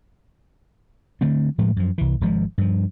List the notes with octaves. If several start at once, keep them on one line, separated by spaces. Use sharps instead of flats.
D3 A3 C4
A2 F3 G#3 A3
F#2 F3
C2 E3
G#1 F3 G#3
G2 F3